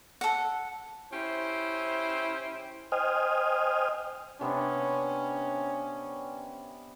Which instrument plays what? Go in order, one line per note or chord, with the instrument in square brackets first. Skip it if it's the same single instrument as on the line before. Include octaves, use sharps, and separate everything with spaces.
[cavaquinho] A4 F#5
[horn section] C#4 E4 G4 C5
[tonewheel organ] C5 D#5 G5 G#5 D#6 F6
[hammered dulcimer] C3 B3 D4 [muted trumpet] C#4